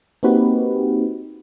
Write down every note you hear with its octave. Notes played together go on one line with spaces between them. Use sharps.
A#3 C4 D#4 F#4 G4 B4